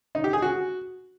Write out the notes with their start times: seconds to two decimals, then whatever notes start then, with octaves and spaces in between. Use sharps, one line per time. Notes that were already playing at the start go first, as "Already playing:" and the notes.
0.15 D#4
0.24 G4
0.33 G#4
0.42 F#4